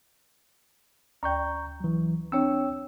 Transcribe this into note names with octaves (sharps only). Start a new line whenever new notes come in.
D2 D5 G5 A#5 C#6 G6
E3 F#3
C4 D4 C#5 G5 E6